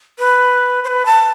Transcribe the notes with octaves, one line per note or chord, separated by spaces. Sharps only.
B4
C5
B4
A5